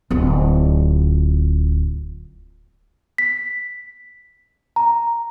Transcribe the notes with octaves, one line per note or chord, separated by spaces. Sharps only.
D1 F4
B6
A#5